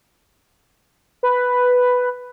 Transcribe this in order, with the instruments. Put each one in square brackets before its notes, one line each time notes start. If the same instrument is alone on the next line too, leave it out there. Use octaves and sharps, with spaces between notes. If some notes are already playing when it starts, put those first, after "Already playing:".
[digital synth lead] B4